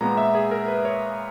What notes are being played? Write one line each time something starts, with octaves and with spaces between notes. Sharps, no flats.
A#2 G#3 B3 A#5
E5
G#4
A#4
B4
C#5